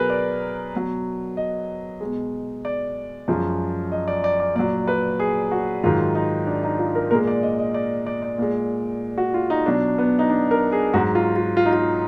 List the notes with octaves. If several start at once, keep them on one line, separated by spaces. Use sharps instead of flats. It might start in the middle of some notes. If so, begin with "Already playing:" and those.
Already playing: B2 F#3 G#4 A#4 B4
D5
B2 F#3
D#5
B2 G#3
D5
F#2 F3 G#3
D#5
D5
D5
D5
A#2 F#3 D5
B4
G#4
F#4
G#2 D#3 F#3 F4
D#4
D4
D#4
F4
A#4
A#2 G#3 A#4
D5
D#5
D#5
D5
D5
D5
A#2 G#3
F#4
F4
D#4
B2 F#3 D4
B3
D#4
D4
A#4
G#4
G#2 F#3 F#4
F4
F4
F4
D#4
F4